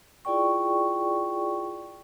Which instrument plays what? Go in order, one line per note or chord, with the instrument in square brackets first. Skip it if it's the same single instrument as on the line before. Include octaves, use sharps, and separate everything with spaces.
[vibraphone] E4 F4 G#4 D5 G5 C#6